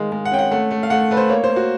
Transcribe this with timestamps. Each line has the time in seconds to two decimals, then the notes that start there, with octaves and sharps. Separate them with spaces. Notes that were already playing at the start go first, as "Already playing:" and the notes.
Already playing: D#3 G#3 F5
0.12 G#3
0.25 F#5
0.32 C#4 G5
0.39 F#5
0.52 A3 F#5
0.71 A3
0.83 F5
0.90 A3 F#5
1.11 A3 B4
1.17 C5
1.30 A#3 C#5
1.44 C5
1.50 A#3
1.56 F#4